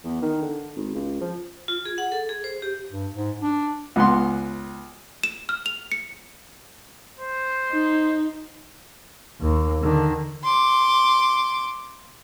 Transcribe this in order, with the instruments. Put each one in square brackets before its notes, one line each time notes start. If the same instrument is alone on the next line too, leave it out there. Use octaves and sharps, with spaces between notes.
[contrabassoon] E2
D#3
D3
G#1
C#2
F3
[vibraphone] F4
G#4
F#5
A4
G#4
C5
G4
[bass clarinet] G2
G#2
D4
[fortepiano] C#2 B3 C6
[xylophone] E7
F6
F7
C#7
[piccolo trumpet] C5
[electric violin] D#4
[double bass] D#2
D3 D#3
[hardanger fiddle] C6 D6